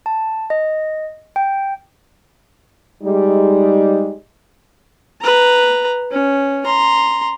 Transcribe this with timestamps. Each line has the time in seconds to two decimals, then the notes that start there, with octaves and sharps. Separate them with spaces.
0.06 A5
0.50 D#5
1.36 G5
3.04 G3 G#3 D#4
5.22 B4 A#5
6.11 C#4
6.66 A#5 C6